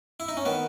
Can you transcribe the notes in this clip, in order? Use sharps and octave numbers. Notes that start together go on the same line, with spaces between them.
E4
D#4
C#4
D#3 B3